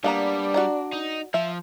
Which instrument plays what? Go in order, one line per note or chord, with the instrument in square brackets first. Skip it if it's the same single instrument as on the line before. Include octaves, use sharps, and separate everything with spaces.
[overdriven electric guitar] G3 [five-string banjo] A#3 B3 A#5 [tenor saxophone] D4
[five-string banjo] F#4 D5 A#5
[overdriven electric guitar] D#4
[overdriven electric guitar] F3 [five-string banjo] E5